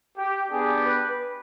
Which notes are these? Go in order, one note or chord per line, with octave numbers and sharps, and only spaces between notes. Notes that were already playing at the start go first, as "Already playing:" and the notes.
G4
B3 D4 G4 G#4
B4